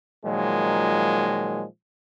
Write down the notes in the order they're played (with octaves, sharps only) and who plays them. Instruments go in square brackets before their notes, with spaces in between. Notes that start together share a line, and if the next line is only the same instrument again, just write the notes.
[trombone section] A#2 D#3 F3 F#3 G#3